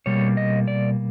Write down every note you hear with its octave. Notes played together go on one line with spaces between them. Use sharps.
B2 G3 A#3 C#5
D#5
D5